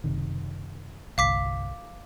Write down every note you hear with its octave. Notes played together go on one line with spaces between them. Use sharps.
F#1 C3 D#3
G1 C2 F5 D6 B6